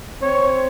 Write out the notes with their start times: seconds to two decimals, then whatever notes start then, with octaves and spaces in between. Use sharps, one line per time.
0.22 C4 C#5